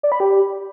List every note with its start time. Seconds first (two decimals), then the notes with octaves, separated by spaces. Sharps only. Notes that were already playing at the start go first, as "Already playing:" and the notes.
0.03 D5
0.12 B5
0.20 G4